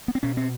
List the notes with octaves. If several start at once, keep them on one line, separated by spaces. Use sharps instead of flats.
B3
C4
B2 C#4
C4